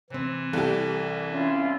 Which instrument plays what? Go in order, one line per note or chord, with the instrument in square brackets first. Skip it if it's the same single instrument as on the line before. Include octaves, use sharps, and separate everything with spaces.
[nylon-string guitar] C3 C4 [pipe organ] E3
[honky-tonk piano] C2 [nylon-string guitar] G4 A4
[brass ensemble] C#4 E4 F4